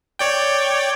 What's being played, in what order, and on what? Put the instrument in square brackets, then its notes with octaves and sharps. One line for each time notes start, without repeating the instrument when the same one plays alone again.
[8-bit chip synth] C#5 D5 G5